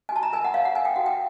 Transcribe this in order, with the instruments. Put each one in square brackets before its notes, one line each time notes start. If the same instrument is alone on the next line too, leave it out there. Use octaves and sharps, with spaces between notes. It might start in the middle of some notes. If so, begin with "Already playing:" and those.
[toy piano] G#5
F#4 A5
A#5
A#4 G#5
F#5
C#5 F5
F#5
A#4 G#5
G5
F#4 F#5
G5